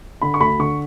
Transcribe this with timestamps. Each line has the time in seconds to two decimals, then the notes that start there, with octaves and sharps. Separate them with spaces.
0.22 D3 B5
0.34 C#6
0.40 D2 B5
0.59 D3 C#6